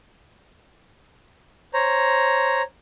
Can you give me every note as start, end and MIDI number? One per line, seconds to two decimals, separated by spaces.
1.74 2.62 72
1.74 2.62 73
1.74 2.62 82